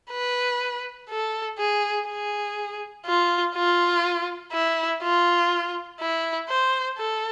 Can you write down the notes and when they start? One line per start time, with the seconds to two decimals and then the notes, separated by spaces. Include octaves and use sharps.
0.11 B4
1.09 A4
1.58 G#4
2.08 G#4
3.05 F4
3.55 F4
4.52 E4
5.02 F4
6.00 E4
6.49 C5
6.98 A4